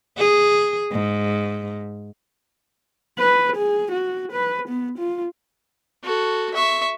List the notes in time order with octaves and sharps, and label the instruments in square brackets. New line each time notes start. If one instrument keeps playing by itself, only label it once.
[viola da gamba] G#4
G#2
[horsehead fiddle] B4
G#4
F#4
B4
B3
F4
[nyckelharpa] F#4 A4
E5 C#6